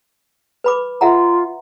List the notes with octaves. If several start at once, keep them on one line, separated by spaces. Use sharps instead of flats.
B4 B5 D6
F4 E5 F#5 A#5